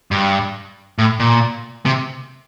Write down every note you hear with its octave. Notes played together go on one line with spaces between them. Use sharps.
G2
A2
A#2
C3